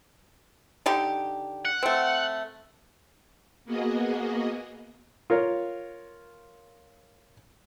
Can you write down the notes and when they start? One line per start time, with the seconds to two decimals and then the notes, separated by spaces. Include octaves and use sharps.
0.86 D3 D#4 G4
1.65 F#5
1.83 A3 C4
3.65 A#3 B3 F#4 G#4 D#5
5.30 F4 A#4 C#5